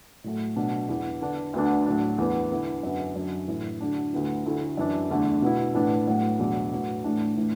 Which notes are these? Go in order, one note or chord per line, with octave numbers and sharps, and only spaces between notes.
A2 F#3 A3
B2 F#3 D4
E2 E3 B3
D3 B3 D4
D2 D3 B3 D4
A2 F#3 D4
E2 E3 B3
D3 B3 E4
F#2 D3 B3
F#2 F#3 D4
A2 E3 A3 E4
D3 F#3 D4
D2 D3 B3 E4
D2 D3 A3 E4
F#2 E3 D4
E2 D3 A3 D4
B2 B3 E4
A2 E3 B3 D4
A2 F#3 B3
E2 B2 F#3 D4
A2 F#3 B3
A2 E3 A3 D4
A2 E3 D4